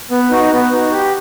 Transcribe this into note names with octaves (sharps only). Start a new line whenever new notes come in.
B3
D#4 F#4
B3
D#4 F#4
G4